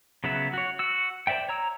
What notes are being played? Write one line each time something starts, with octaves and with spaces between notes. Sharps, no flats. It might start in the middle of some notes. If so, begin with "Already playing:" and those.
C#3 F#3 B3 E5
F#4 C#5
F#4 E6
C5 D5 E5 G5
C#5 A#5 E6